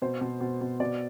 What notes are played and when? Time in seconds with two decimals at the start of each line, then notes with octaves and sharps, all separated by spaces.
0.02 B2 C5
0.21 B2
0.41 B2
0.61 B2
0.80 B2 D5